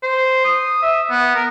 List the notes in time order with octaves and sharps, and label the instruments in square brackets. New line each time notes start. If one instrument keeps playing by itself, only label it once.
[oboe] C5
D#6
E5
B3
A#4